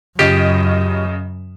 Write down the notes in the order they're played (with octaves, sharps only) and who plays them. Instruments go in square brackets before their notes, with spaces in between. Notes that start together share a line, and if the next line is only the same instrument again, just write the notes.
[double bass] F#2 [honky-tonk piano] C#3 D#5 [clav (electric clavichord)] F4 G4